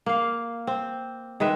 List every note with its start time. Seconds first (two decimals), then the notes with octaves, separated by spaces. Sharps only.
0.06 A#3 F5
0.67 C4
1.40 D#3 G#3 B4 E5